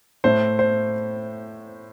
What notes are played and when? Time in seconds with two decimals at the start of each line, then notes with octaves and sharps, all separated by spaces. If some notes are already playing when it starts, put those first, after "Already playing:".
0.24 A2 A3 C5
0.59 C5